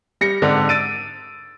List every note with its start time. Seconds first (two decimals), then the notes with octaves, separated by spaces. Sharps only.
0.21 G3 A#6 C#7
0.42 G#2 D3 C4 D4
0.69 E6 A6 D7 D#7